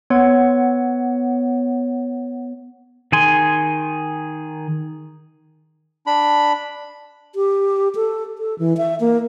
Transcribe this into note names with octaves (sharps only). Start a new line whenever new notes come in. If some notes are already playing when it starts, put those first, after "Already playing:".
B3 C#5 F#5
D#3 G#4 G#5 C6
D4 B5
G4
A4
A4
E3
E5
A#3